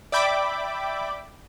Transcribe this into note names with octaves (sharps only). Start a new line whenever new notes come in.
D5 E5 G5 B5 D6